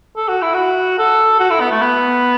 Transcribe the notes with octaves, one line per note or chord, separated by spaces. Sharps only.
A4
F#4
E4
F#4
A4
F#4
E4
B3
A3
B3